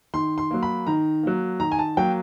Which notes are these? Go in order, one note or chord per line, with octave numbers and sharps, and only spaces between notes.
D#3 C6
C6
F#3 A#3
B5
D#3 A#5
F#3 A#3
D#3 A#5
G#5
A5
F#3 A#3 G5